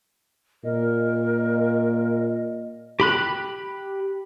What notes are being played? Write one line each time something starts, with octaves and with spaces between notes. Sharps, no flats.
A#2 A#4 D#5
G4 B5 F#6